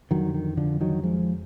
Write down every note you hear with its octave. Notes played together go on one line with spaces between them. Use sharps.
F2 D3 D#3 F#3
D#3
D3 F3
D#3 F#3
F3 G#3